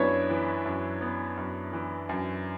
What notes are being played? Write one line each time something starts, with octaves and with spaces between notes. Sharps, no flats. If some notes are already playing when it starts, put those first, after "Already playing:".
Already playing: F#2 B3 D4 E4 B4 C#5
E3
F#2
B3
F#2
E3
F#2